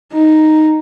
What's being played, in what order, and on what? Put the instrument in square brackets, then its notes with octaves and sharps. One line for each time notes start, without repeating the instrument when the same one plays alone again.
[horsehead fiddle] D#4